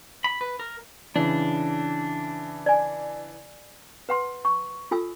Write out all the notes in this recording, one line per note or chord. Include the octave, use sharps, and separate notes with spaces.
B5
B4
A#4
C#3 E3 D4
D5 G#5
B4 F#5 C6
C#6
F4 A4 G#5 E6